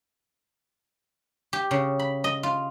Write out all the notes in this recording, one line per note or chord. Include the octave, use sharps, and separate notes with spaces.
G4
C#3
B5
D#5
F4